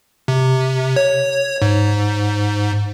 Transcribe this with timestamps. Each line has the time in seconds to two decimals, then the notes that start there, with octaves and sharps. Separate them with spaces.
0.28 C3
0.96 C#5
1.62 G#2